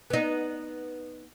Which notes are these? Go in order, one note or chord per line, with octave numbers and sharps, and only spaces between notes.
B3 D#4